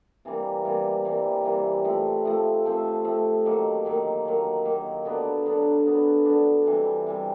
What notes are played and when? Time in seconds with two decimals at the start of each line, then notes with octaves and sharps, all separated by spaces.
0.25 C3 E3 G3 A#3
0.64 C3 E3 G3 A#3
1.05 C3 E3 G3 A#3
1.44 C3 E3 G3 A#3
1.85 F3 A3 C4
2.25 F3 A3 C4
2.65 F3 A3 C4
3.04 F3 A3 C4
3.45 D#3 F#3 A#3
3.85 D#3 F#3 A#3
4.25 D#3 F#3 A#3
4.65 D#3 F#3 A#3
5.05 D3 F#3 B3 D4
5.46 D3 F#3 B3 D4
5.85 D3 F#3 B3 D4
6.25 D3 F#3 B3 D4
6.66 C3 E3 G3
7.07 C3 E3 G3